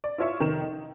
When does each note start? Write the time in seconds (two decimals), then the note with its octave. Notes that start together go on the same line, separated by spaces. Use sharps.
0.04 D5
0.18 E4 F4 C#5 E5 C#6
0.40 F1 D#3 A#4 E7
0.61 D#4